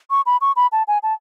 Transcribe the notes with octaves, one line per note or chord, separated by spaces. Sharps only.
C#6
B5
C#6
B5
A5
G#5
A5